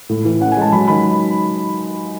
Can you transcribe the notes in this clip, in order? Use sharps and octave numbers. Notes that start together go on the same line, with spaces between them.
A2
E3
C#4 F#5
G#5
G#3 A5
F#3 B5
D#3 B5